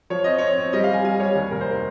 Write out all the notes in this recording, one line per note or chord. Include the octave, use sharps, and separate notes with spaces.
F3 C#5
C4 D#5
C4 C#5
C4
G3 D#5
F5
G3 G#5
G3 G#5
G3 C#5
D#2
F1 A#4
C5
A#4